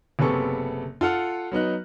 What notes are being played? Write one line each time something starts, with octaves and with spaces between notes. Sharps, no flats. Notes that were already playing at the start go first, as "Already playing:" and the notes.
F#1 C3 B3 G#4 A4 C#6
F4 A4 F#5 F6
F#3 B3 D#4 F#6